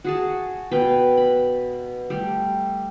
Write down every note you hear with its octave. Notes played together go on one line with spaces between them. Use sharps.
F#4 G#4 A5
B2 B4 G5
B5
G3 A3